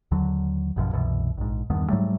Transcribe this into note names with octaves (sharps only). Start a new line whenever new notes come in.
D#2 D3 F#3
A1 F#2 B2 F3
C2 F#2 B2 E3
A#1 G#2
E2 G2 D#3 B3
G#2 F#3 G3 A3